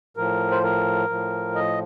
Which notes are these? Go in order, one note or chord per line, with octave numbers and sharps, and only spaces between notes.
A2 F3 A#4
C5
A#4
A2 F3
D#5